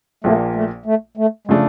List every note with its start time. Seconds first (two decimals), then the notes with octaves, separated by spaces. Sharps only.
0.24 A#1 A#2 F3 A3 A#3
0.55 A3
0.86 A3
1.17 A3
1.47 C#3 F3 G#3 A3 D4